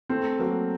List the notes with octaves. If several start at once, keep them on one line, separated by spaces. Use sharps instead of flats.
A3 C4
F#3 A#3